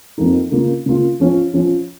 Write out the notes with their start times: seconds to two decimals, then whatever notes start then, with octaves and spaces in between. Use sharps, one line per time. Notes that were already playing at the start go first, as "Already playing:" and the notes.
0.18 F2 F3 A#3 D#4
0.51 C#3 A#3 F4
0.86 C#3 A#3 F4
1.20 F3 C#4 F4
1.53 F3 C#4 F4